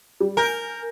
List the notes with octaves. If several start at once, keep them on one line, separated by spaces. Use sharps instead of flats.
G3
A#4 G#5 G6